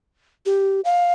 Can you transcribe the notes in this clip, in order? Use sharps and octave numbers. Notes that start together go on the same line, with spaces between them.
G4
F5